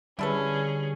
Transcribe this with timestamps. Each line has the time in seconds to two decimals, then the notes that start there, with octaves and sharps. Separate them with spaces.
0.19 D3 G3 C#4 E4 G#4 A4 B4